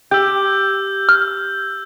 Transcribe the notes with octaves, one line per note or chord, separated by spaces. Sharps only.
G4 E6 G6
F6